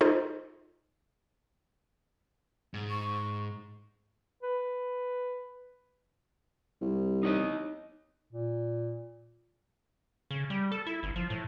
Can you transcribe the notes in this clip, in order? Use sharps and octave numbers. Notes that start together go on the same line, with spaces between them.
D#4 F4 G#4 A4 C5 D#5
G#2
C#6
B4
C2
D#4 C#5 D#5
A#2
C#3
G3
A4
E4
G1
F3
A2